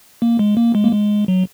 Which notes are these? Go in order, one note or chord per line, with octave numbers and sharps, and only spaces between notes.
A#3
G#3
A#3
G#3
A#3
G#3
F#3